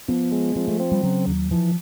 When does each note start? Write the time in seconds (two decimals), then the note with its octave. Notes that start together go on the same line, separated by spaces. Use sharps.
0.08 F3 B3
0.32 G#3
0.56 F3 C4
0.68 A3
0.80 C4
0.92 G3
1.04 C#3 F#3
1.27 D#2
1.51 E3 F3